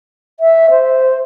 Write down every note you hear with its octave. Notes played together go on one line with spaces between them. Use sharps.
E5
C5